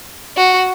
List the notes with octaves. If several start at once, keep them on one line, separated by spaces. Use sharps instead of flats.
F#4